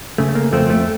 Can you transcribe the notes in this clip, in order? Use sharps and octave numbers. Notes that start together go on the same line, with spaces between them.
C#3 A3
A#3
F2 A3 C4
A3